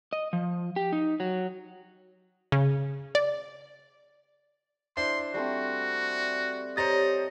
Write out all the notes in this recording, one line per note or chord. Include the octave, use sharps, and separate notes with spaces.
D#5
F3
G4
D#4
F#3
C#3
D5
D4 E4 C5 C6
G3 A3 C4 F#4
G4 C5 C#5 D#5 A#5 A6